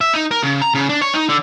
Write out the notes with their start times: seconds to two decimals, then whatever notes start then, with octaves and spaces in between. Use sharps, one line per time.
0.01 E5
0.14 D#4
0.31 A#4
0.43 C#3
0.62 A#5
0.74 C#3
0.89 D4
1.02 C#5
1.14 D#4
1.29 D3